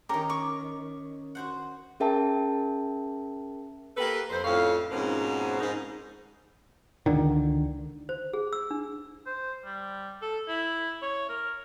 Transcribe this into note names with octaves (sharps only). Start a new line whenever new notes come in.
D#3 C#4 G4 A#4
C#6 D6
F#4 C5 F#5
C#4 G#4 A#4 E5 G5 A5
A#3 G4 A4 B4
F2 C5
F2 A2 C#4 C#5 F5
G#2 B2 F3 A#3 C4 C#4
G#2 D#4
C#2 D3 D#3
C5
G#4
E6
D4
C5
G3
A4
E4
C#5
A#4